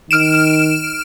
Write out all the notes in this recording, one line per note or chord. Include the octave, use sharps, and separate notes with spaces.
D#3 F6 D7 E7